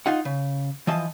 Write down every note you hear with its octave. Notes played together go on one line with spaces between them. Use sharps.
D#4 F4 F#5
C#3
E3 F3 D#5 A5